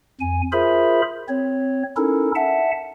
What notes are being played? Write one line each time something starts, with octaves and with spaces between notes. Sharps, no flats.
F2 G#5
F4 G#4 A#4 C5 E5 B5
C4 C#5
C#4 D#4 E4 A4 A#4
E5 F#5 A5